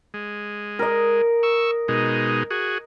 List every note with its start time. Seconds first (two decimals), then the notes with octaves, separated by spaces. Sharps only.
0.14 G#3
0.79 A#4 D#5
1.43 C#6 E6
1.88 B2 G#3 D#4
2.50 F#4 G#4